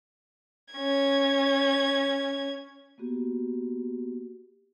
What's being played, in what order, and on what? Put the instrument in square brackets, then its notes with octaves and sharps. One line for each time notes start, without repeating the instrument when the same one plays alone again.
[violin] C#4 G#6
[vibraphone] A#3 B3 F#4 G4